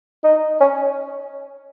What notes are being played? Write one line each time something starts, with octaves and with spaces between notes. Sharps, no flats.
D#4
C#4